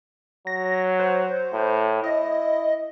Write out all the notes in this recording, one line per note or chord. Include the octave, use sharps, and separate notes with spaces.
F#3 A#6
C5
A2
E4 D#5